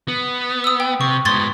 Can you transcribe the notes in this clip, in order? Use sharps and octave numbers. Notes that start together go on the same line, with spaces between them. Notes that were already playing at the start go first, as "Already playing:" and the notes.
B3
D#6 E6
G5
C3 C#6
G#2 B3 C6 G#6 A6